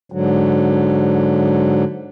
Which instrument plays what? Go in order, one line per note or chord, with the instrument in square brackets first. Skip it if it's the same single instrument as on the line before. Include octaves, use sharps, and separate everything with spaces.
[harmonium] G#2 D3 F#3